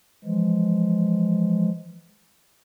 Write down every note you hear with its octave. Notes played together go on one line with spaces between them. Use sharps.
E3 F3 G#3